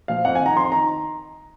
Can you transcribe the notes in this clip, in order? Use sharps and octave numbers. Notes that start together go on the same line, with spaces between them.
A#2 F3 F5
F2 F#5
D#3 G#5
A#5
F2 C6
D#3 A#5